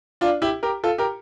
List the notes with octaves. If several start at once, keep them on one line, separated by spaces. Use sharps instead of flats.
D4 F4
E4 G4
G4 A#4
F4 A4
G4 A#4